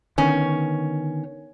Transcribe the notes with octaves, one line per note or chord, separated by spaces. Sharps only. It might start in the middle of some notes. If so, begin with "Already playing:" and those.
D3 D#3 B3 C#4